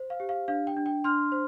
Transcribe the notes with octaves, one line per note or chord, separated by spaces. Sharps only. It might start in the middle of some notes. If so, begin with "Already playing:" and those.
Already playing: C5
F5
G4
F5
D4 F5
G5
D4
G5
D4 C6 F6
C5